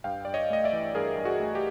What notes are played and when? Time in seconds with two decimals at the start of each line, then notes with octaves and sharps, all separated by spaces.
0.04 G2 F5 G5
0.25 G2 D5
0.34 C#5 D#5
0.50 A3 D#5
0.64 D5 E5
0.73 E3
0.95 G2 G#4 A#4
1.17 G2
1.25 F#4 G#4
1.40 A3
1.55 G4